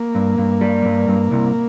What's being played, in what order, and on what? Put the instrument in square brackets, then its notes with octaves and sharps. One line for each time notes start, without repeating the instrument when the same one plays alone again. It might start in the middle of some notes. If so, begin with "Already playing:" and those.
Already playing: [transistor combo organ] A#3
[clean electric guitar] G2
G2
G3
G2
G2
C2